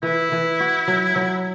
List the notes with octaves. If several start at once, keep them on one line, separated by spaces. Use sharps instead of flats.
E3 E4
E3
F#4
F#3
F#3